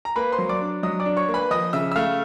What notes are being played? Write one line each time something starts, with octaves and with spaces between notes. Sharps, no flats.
A#5
A#3 B4 B5
C5 C6
F#3
D5 D6
D4
F#3 D#5 D#6
D5 D6
D4
C#5 C#6
A#3
B4 B5
F3 D#5 D#6
C#3 E5 E6
E6
A3 F5 F6